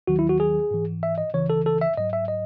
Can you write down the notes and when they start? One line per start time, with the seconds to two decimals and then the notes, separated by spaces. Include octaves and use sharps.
0.07 D#2 D#3 F#3 F#4
0.19 E4
0.29 F#4
0.40 G#4
0.71 G#2 E3
1.03 E5
1.18 D#5
1.34 C#2 C#3 E3 C#5
1.50 A4
1.66 A4
1.82 E5
1.97 G#2 F#3 D#5
2.13 E5
2.28 D#5